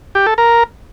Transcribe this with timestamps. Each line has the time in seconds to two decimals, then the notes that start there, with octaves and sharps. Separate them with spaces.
0.15 G4
0.26 A4
0.38 A#4